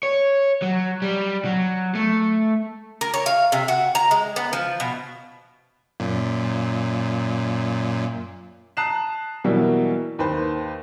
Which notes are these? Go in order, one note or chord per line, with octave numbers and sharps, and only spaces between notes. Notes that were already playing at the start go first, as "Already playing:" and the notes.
C#5
F#3
G3
F#3
A3
A#4
C#5
F5
C3
F#4
A#5
G#3
B3
F3
B2
F#2 A#2
A5 A#5 D#6 F#6 C7 E7
B2 E3 F#3 G3 A#3 E4
D#2 B4 C5